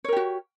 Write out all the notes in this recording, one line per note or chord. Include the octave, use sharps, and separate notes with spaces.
F#4 G4 A#4 C#5